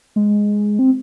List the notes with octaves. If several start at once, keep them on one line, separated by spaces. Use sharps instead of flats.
G#3
C4